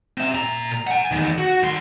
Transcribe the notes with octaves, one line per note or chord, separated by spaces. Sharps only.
C4 E5
A#2 A#5
F#5 G#5
E2 D#3
F#4
D#3 C6